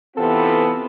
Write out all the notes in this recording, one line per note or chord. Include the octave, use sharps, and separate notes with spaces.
C3 E3 B3 C4 F4 A4